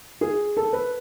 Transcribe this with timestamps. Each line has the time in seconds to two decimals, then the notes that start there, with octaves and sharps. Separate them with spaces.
0.21 G#4
0.57 A4
0.73 B4